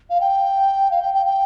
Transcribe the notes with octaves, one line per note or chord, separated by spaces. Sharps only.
F5
G5
F5
G5
G5
G5